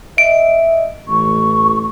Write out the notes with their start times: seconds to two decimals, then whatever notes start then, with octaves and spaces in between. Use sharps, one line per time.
0.18 D#5 E5 D7
1.08 A1 C#6